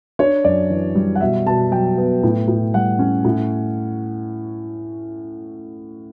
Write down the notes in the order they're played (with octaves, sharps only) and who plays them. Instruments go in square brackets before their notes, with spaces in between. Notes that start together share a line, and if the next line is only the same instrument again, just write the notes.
[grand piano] D4 C#5
F#2 D5
E3
G3
F#5
B2 E5
B2 A5
F#3 G5
B3
A2
A2
G3 F#5
C#4
A2